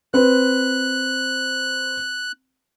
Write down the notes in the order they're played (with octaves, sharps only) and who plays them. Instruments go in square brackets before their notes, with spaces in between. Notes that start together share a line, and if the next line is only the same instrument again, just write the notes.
[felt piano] C4 B4 [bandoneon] F#6